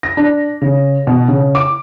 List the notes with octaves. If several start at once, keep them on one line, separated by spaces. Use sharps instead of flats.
A#6
D4
C#3
B2
C#3
D6